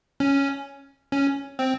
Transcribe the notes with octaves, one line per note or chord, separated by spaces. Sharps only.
C#4
C#4
C4